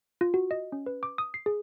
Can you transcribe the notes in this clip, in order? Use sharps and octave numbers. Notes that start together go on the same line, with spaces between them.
F4
F#4
D#5
C#4
B4
D6
D#6
C7
G#4